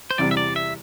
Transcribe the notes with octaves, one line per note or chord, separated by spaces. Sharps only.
C5
E2 C3 G3 D5
E5
D5
E5